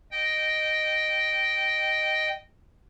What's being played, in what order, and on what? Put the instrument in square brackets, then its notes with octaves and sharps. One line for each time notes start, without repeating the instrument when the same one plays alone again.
[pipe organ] D#5 G5